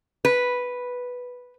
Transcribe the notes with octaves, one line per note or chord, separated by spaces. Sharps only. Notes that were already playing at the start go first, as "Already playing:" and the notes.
B4